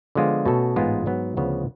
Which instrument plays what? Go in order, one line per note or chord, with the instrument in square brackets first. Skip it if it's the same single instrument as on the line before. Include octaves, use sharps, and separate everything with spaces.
[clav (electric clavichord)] D3 F3 G#3 B3 F4
B2 A3 C#4 F#4 A4
A1 G#2 G#3 B3 F4
G#2 F#3 B3
D2 C#3 F3 B3